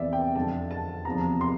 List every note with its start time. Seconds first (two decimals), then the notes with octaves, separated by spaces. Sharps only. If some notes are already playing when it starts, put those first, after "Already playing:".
Already playing: E2 C3 E3 D5 E5
0.13 G5
0.35 F2 D3 F3 A5
0.71 A5
1.05 E2 C3 F3 A#5
1.41 C6